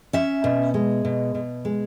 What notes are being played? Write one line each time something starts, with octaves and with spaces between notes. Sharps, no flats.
C#4 E5
B2
G#3
B2
B2
G#3